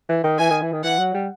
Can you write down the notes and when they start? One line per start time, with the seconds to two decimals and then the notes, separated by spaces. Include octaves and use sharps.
0.09 E3
0.24 D#3
0.39 E3 G#5
0.50 D#3
0.62 E3
0.72 D#3
0.84 E3 F#5
0.99 F#3
1.14 G3